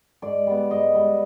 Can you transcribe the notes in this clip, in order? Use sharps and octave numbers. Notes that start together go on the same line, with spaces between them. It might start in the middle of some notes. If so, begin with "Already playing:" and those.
G#2 D5
G3 B3
G#2 D#5
G3 B3